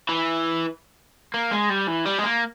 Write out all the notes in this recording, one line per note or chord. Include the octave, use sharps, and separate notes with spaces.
E3
A#3
G#3
G3
E3
G3
G#3
A#3